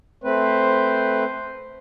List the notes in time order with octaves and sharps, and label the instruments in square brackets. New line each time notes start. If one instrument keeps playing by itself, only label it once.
[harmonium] A3 C4 B4 [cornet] C5